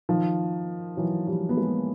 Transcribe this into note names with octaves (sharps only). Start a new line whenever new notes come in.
D#3 F3
E3 F#3
F3 G3
B3
G#3 A#3